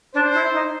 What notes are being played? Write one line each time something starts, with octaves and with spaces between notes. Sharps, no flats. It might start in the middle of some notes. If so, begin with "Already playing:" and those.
D4 C5
E4
D#4